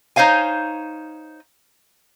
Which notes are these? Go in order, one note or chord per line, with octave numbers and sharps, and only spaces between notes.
D#4 C5 C#5 F5 G#5